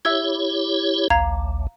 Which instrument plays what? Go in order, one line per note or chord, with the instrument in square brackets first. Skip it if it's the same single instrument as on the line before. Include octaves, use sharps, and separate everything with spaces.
[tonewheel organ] E4 G4 C#5 [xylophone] E5 E6 G#6
[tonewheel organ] A1 D2 [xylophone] F5 A#5 G#6